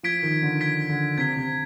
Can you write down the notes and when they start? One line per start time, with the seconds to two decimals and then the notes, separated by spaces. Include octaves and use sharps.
0.03 F3 G#6 B6 D7
0.23 D#3
0.42 D3
0.61 G#6 B6 D7
0.89 D3
1.18 C3 G#6 B6 D7
1.36 C3